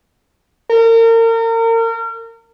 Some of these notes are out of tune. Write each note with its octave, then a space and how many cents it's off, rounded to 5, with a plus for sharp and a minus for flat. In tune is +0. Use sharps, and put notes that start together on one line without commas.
A#4 -35